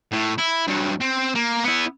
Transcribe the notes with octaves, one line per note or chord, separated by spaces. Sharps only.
A2
E4
G2 F#3
C4
A#3
B3 E4